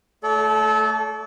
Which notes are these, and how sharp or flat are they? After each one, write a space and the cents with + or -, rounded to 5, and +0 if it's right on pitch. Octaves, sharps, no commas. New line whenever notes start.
A3 +0 A4 -30 D5 -45